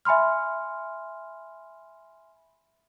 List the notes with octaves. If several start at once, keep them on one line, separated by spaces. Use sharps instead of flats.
E5 G#5 B5 C6 F6